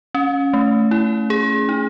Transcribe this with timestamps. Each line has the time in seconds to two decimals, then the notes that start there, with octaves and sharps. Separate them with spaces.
0.15 C#4
0.53 A3
0.91 E4
1.30 G#4
1.69 D#4